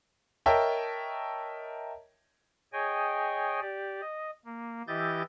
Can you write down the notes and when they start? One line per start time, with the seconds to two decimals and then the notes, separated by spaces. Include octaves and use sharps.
0.46 A#4 C#5 D#5 E5 G5 A5
2.73 G#4 C#5 D#5 G5 G#5
3.61 G4 D5
4.01 D#5
4.45 A#3
4.88 E3 E4 G4 D#5 G6 A6